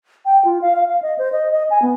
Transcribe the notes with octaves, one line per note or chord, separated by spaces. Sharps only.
G5
F4
F5
F5
F5
D#5
C5
D#5
D#5
G#5
B3